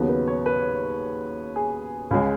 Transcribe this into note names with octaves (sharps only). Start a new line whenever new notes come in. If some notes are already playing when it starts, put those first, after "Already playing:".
Already playing: D#2 C#3 F#3 B3
B4
C#5
B4
G#4
C#2 C#3 G#3